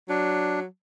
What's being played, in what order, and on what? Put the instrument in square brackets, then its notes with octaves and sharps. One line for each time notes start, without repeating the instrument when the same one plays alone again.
[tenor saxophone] F#3 [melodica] D4